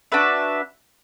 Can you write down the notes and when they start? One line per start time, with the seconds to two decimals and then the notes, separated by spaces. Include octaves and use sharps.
0.12 D4 F#4 B4 E5